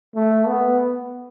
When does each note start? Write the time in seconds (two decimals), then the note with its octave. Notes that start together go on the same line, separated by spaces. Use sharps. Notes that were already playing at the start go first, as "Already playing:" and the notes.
0.15 A3
0.47 B3